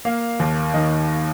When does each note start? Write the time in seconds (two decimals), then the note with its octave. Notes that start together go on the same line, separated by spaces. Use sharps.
0.05 A#3 F5
0.40 D#2
0.74 D#3 D#5